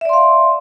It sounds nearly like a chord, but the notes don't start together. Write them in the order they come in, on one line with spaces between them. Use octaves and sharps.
E5 D5 C6 F5